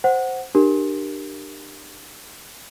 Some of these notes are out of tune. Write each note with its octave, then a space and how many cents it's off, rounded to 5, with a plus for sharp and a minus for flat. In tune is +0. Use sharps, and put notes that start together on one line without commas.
C5 +0 F#5 +0
D4 +35 G4 +0 A#4 +0